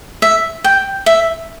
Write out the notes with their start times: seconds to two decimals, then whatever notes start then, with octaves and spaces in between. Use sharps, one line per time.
0.22 E5
0.64 G5
1.06 E5